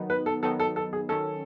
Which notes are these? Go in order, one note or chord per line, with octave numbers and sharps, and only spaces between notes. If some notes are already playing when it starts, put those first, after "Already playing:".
Already playing: D#3 F#3 B3 D#4
B4
A4
D#3 F#3 B3 D#4 A4
A4
A4
G#4
D#3 F#3 C#4 A4